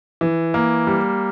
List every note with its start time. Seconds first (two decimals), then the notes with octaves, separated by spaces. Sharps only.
0.21 E3
0.54 A#3
0.87 G3